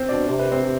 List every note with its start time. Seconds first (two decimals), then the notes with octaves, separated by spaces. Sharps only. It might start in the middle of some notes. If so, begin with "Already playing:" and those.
Already playing: C4 C5
0.08 B2 D4 D5
0.26 C3 C5
0.39 B4
0.51 C4 C5
0.64 C3